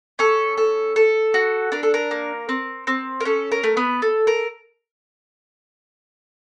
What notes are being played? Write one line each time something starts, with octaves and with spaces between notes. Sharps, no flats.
C#4 A4
A4
A4
F#4
D4 A#4
A4
A#4
A#3
C4
C4
A#4
C#4 A4
A#4
A3
B3 B4
A4
A#4